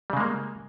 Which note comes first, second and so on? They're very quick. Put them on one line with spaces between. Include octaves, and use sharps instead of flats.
G3 C#3 G#3 A#3